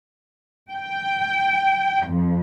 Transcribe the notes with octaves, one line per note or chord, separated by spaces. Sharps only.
G5
F2